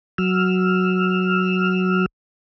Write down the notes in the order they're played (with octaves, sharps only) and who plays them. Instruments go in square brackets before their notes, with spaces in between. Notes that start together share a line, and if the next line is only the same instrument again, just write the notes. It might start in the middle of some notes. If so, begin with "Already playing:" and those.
[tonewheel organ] F#3 E6 F6